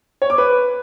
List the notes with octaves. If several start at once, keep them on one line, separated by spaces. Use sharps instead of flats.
C#5
D6
B4